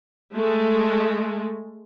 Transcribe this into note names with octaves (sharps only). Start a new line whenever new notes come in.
G#3 A3